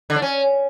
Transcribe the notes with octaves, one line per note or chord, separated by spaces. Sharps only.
D3
D4
C#4